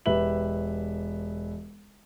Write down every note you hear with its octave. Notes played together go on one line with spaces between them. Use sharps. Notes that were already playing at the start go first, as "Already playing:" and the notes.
E1 G4 B4 E5 F#7